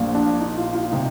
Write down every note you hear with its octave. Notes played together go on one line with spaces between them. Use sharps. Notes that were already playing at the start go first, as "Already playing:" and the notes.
Already playing: A#1 A#2 F3
D4
D#4
F4
F4
C3 D#4